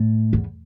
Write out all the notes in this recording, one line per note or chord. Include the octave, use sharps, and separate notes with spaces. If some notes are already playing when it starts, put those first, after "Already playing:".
Already playing: A2
E2